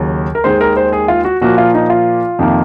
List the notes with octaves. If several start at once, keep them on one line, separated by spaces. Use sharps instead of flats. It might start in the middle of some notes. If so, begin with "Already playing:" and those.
Already playing: D#2 C#3 F#3
A#4
D#2 D#3 G#3 C5
A#4
C5
G#4
F4
F#4
A#2 F3 A#3 F#4
F4
D#4
F4
F2 C3 D#3 A#3